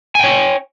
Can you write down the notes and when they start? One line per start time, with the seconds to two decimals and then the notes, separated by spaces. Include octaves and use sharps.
0.15 G#5
0.19 G5
0.24 C#5